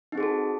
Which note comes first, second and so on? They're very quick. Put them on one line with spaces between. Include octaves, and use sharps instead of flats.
D#4 C4 G#4 F#4 A4